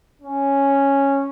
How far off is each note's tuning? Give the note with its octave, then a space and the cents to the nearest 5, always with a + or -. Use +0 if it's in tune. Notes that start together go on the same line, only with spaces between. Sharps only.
C#4 -5